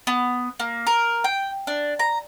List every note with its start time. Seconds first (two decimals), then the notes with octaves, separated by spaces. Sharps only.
0.07 B3
0.60 A#3
0.87 A#4
1.24 G5
1.67 D4
1.99 A#5